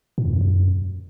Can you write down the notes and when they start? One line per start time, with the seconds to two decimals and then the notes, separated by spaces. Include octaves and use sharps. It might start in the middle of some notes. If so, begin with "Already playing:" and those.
0.18 A#2
0.26 E2
0.33 F2
0.41 F#2